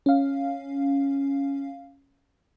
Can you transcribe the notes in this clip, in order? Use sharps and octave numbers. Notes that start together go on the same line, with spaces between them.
C#4 F5